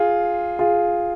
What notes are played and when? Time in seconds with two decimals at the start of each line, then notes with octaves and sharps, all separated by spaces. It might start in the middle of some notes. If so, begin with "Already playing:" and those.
Already playing: F4 G#4
0.59 F4 G#4